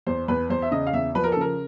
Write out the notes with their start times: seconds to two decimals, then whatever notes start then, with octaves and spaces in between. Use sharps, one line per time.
0.07 E2 C5
0.28 E2 B4
0.50 E2 C5
0.62 E5
0.71 C#3 D#5
0.87 F5
0.93 E2 E5
1.15 F3 B4
1.24 A#4
1.32 A4
1.36 C#3 A#4